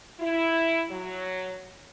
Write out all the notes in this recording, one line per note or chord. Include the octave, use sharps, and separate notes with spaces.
E4
F#3